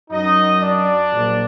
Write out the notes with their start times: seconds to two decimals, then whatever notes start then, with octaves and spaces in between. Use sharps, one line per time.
0.11 F#2 F#3 D#4 D#5
0.60 D4 D5
1.10 A#1 A#2 F#3